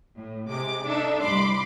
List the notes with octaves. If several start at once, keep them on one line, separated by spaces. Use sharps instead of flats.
A2
C3 G#3 D6
D4 D#4 A4 E5
C2 B5 C6 D6